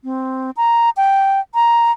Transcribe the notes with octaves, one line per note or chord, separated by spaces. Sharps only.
C4
A#5
G5
A#5